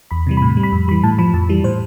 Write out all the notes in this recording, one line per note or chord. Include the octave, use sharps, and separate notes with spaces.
E2 B5
C3 E3 G3
A2 B5
G3
B5
F2
E3 G3 B5
A2 A5
F3 B5
F2 A5
E3 G3
A2 C5